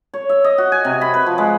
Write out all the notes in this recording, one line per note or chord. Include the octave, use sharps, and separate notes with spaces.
C#5
E5
D#5
F#4
G#5
C3
B5
B4
F3
G#3